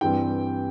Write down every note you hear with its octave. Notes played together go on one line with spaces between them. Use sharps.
G2 E3 G3 C4 G5